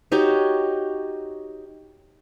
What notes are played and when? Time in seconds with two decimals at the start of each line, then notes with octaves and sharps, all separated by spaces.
0.12 D#4 F#4 G4 C#5